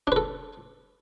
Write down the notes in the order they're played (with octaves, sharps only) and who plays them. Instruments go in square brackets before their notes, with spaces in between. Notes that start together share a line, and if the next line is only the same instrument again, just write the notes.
[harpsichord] D4
B4
A4